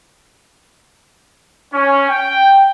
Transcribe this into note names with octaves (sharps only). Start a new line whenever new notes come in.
C#4
G5